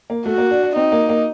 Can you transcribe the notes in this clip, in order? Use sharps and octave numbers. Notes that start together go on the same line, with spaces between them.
A#3
A3 F#4
A#3
D4
D4
C4 D#4
A#3
A#3